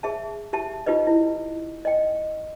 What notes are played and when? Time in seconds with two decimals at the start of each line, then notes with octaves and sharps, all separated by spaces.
0.03 G#4 E5 A5
0.53 G4 E5 A5
0.86 D#4 F4 G4 B4 D#5
1.07 E4
1.85 D#5 G5